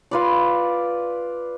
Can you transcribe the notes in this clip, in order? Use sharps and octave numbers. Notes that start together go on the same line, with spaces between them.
F4 B4 D5